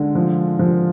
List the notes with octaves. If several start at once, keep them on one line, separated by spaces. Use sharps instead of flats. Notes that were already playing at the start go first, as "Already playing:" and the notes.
Already playing: D3 G#3
F3
F3